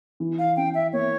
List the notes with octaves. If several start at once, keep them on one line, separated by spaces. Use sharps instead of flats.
E3
F5
C#4 G5
E5
A#3 C#5